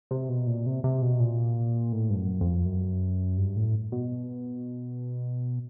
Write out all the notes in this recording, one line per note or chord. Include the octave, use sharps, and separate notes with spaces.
C3
B2
A#2
C3
C3
B2
A#2
A2
G2
F#2
F2
F#2
G2
A2
B2